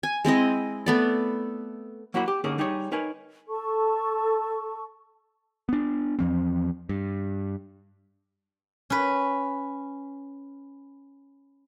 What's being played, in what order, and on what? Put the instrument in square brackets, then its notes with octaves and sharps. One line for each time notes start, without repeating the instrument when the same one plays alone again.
[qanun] G#5
G#3 C4 E4 D#5
A3 B3 D5
[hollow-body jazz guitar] F#3 A#3 E4 F#4 F#5 B5
G4
D3 A#3 C#4 D#4 G#4 A#4
G3 D#4 G4 G#4 C#5
D#4 A#4 B4 C#5 G#5
[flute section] A4 A5 C#6
[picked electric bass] B3 D4
E2 F3 C4
G2
[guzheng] C#4 B4